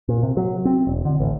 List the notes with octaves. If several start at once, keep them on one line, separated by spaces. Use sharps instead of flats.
A#2
C3
F#3
C4
E1
D3
A1